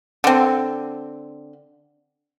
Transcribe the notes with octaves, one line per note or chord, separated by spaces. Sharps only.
D3 C4